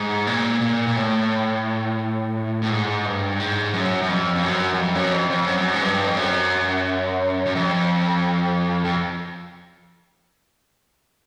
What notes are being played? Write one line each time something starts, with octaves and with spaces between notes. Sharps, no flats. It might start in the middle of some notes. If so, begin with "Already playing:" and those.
Already playing: G#2
A#2
A#2
A#2
A2
A2
G#2
G2
G#2
F#2
F#2
F2
F2
F#2
F#2
F2
F#2
F2
F2
F#2
G#2
G2
F2
F#2
F#2
F2
F2